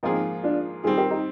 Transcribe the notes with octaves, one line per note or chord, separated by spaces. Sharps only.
G#2 F3 A#3 C4 D#4 F4 G#4
D4 F4
D#3 G3 C4 F4 G#4
G4 A#4
D#4 G4